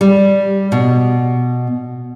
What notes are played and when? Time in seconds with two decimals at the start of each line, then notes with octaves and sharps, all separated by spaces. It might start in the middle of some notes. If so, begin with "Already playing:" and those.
0.01 G3
0.72 B2